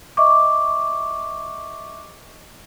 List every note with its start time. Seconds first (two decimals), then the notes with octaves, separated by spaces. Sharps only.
0.17 D#5 E5 C#6 D6